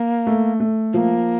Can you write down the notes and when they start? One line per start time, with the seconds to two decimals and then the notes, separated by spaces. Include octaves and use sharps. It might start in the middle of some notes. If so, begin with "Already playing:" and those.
Already playing: A#3
0.27 A3
0.60 A3
0.94 F3 A#3